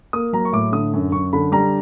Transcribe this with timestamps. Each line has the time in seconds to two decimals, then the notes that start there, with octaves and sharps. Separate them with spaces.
0.13 A#3 D#6
0.33 F#3 A#5
0.45 C#6
0.53 A2 D6
0.72 D3 D#6
0.93 F#2
1.12 F#2 C#6
1.33 D3 B5
1.52 G3 A#5